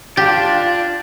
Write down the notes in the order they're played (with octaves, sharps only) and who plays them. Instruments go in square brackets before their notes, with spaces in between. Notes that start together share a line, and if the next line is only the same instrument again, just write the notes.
[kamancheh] F4 [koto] G4 [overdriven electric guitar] D5 A5